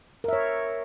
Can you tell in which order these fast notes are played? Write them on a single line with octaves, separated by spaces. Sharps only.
A#4 E5 C#5